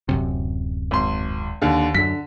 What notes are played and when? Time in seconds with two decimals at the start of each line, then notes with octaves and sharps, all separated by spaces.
0.09 D1 F#2 C3
0.91 G#1 C6
1.62 D#2 D3
1.95 F#2 D3 B6